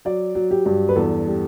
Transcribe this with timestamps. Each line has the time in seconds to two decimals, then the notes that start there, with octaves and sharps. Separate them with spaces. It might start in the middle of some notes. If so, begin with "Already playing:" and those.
0.05 F#3 D5
0.35 F#3
0.51 G4
0.66 G2
0.89 B4
0.96 E2 A4
1.27 G3